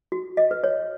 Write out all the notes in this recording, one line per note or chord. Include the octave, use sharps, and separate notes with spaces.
F#4
D#5
B4
C#5